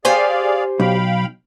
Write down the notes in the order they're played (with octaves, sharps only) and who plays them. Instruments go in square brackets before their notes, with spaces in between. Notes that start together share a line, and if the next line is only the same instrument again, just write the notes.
[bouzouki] G4 C5 G#5 [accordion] G#4 D5 F5
[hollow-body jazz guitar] B1 [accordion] F5 G5 B5